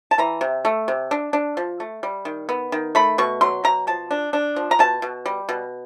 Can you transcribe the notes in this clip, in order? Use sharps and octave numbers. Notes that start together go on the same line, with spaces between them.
A5
E3 A#5
C3
A3
C3
D4
D4
F3
A3
G3
D#3
B3
D#3
A3 B5
B2 C#6
F#3 C6
B2 A#5
F3 A5
D4
D4
F3
A#5
B2 A5
B2
G3
B2